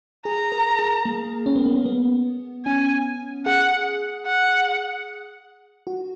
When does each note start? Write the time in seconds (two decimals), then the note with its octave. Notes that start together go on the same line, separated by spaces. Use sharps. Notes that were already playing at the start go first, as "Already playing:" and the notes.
0.25 G#4 A#5
0.52 A#4
0.79 G#4
1.05 A#3
1.46 C#4
1.56 B3
1.66 A#3
1.75 B3
1.86 B3
2.66 C#4 G#5
3.46 G#4 F#5
4.26 F#5
5.87 F#4